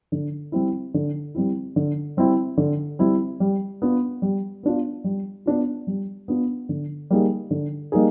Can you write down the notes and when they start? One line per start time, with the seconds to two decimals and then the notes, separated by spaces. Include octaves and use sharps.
0.12 D3
0.52 G3 C4 E4
0.94 D3
1.35 G3 C4 E4
1.76 D3
2.17 G3 C4 E4
2.57 D3
2.99 G3 C4 E4
3.40 G3
3.82 B3 D4 F4
4.22 G3
4.63 B3 D4 F4
5.04 G3
5.46 B3 D4 F4
5.87 G3
6.28 B3 D4 F4
6.69 D3
7.11 G3 A#3 D#4 G#4
7.51 D3
7.92 G3 A#3 D#4 G#4